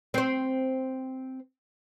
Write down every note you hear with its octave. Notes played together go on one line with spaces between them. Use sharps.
C4 C5